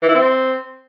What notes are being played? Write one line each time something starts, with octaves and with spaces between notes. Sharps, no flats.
E3
E4
C4